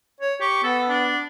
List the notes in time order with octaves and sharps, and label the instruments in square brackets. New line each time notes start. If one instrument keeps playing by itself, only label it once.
[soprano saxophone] C#5
[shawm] G4 [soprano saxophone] C#6
[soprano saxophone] B3 [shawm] A4
[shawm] D4